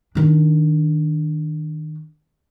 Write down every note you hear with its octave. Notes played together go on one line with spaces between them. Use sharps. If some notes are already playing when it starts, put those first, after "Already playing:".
D#3 D4